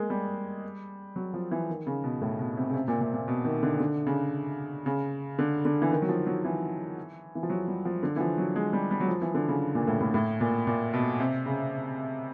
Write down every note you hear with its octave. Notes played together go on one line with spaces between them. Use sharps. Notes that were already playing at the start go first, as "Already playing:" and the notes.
Already playing: G#3 A#3
G3
F#3
F3
E3
D#3
C#3
B2
A2
B2
C3
C#3
C3
A#2
A#2
A#2
B2
D#3
D3
D3
C#3
C#3
D3
D3
E3
D#3
F#3
F3
F#3
E3
E3
F3
F#3
G3
F3
D3
E3
F3
F#3
G#3
G3
G3
F#3
F3
E3
D3
C#3
A#2
A2
A2
A2
A#2
A#2
B2
C3
C#3